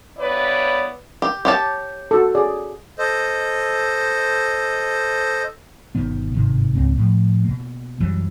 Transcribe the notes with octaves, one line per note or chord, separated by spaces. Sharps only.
G2 B3 E4 B4 C#5 D5
G4
G4 C#5 A5
F#4 A4
G#4 D5
A4 C5 D#5
G1 B2 D#3 B3
G1 G#2 C3 D#3
C#2 G#2 A#3 C4
A2 F3
B2 A#3
F#2 E3 F#3 G3